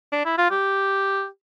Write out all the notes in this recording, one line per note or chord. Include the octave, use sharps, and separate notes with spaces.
D4
E4
F4
G4